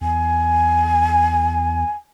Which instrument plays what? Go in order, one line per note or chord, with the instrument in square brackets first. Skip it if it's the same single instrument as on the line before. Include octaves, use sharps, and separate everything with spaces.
[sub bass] E2 [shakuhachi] G#5